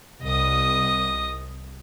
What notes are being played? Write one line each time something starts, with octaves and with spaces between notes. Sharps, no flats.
C2 D#5 D#6